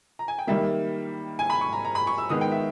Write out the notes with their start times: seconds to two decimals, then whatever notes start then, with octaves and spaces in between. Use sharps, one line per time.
0.19 A#5
0.28 G#5
0.39 G5
0.47 D#3 G3 A#3 E5
1.39 G#5
1.50 B5
1.61 C#6
1.73 A#5
1.85 A#5
1.95 B5
2.07 C#6
2.18 E6
2.29 D#3 G#3 B3 D#6
2.41 G5
2.52 E5